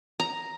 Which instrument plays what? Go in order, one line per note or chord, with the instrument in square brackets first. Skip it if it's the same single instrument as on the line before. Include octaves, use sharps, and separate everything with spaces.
[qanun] A#5